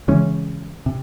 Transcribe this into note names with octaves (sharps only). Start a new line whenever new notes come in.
C#3 E3 G#3 C#4
C3